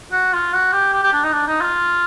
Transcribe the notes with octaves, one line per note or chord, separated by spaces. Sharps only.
F#4
F4
F#4
G4
G4
G4
D4
D#4
D4
D#4
F4